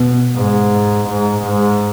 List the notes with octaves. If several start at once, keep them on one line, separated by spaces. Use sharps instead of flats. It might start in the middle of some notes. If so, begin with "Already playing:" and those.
Already playing: B2
G#2
G#2
G#2